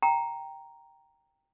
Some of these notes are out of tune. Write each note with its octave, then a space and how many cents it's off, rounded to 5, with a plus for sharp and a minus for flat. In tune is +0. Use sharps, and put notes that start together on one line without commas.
G5 +0 A#5 +0